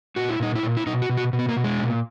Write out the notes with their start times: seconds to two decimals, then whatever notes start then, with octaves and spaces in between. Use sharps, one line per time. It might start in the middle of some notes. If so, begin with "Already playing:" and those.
0.16 A#2 F#4
0.29 E4
0.40 A#2 D#4
0.55 E4
0.63 A#2
0.77 E4
0.87 B2 D#4
1.02 F#4
1.10 B2
1.17 F#4
1.33 B2
1.39 B3
1.49 A#3
1.56 B2
1.64 G#3
1.80 A#2